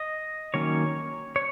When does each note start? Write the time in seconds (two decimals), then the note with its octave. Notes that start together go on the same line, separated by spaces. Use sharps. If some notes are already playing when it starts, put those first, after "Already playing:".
Already playing: D#5
0.54 D#3 F#3 A#3 C#4 C#5
1.36 C#5